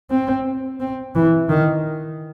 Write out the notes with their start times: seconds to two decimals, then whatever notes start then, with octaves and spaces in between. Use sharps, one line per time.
0.11 C4
0.80 C4
1.15 E3
1.49 D#3